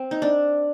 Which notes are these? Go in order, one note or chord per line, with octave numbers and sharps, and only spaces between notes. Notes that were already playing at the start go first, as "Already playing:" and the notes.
Already playing: C4
D#4
D4